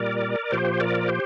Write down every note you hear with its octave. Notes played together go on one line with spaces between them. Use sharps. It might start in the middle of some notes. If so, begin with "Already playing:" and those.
Already playing: A#2 G3 A#4 D5
A#2 F3 G4 C5
A#4 D5
G4 C5